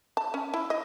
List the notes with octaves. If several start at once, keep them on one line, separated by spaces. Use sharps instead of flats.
A5
C#4
E4
D#5